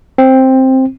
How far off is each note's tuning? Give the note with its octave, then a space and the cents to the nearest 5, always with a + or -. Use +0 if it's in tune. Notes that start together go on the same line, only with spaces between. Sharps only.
C4 +5